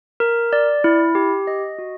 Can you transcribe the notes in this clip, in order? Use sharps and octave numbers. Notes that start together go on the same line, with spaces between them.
A#4
D5
E4
G4
D#5
F#4